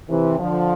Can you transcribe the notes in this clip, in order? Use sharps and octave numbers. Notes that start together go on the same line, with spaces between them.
C3 E3
D3 F3